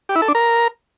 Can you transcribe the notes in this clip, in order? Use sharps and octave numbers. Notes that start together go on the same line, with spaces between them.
G4
E4
A4
D4
A#4